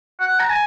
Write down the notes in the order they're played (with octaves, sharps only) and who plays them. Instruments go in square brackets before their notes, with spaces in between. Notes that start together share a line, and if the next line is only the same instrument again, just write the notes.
[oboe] F#5
A#5
G#5